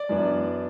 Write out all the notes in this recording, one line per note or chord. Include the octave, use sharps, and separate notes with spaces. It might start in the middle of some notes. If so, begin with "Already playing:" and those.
Already playing: D5
F#2 E3 B3 D4